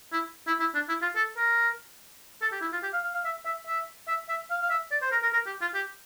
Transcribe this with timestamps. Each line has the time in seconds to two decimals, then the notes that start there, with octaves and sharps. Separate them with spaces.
0.13 E4
0.47 E4
0.60 E4
0.75 D4
0.89 E4
1.02 F4
1.16 A4
1.37 A#4
2.42 A4
2.52 G4
2.62 E4
2.73 F4
2.83 G4
2.93 F5
3.04 F5
3.14 F5
3.25 E5
3.45 E5
3.67 E5
4.08 E5
4.29 E5
4.50 F5
4.62 F5
4.70 E5
4.91 D5
5.02 C5
5.12 A#4
5.23 A#4
5.33 A#4
5.46 G4
5.61 F4
5.74 G4